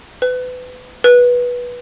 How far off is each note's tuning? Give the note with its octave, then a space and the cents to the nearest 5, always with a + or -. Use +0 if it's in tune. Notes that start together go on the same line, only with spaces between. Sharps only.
B4 +30
B4 -15